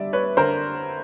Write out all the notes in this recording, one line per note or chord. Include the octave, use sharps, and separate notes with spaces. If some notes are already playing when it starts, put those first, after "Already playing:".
Already playing: D3 G3 D5 E5
B4 C#5
D3 A#4 C5